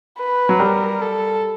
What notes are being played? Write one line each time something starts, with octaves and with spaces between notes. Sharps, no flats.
B4
F#3
G3 A#4
A4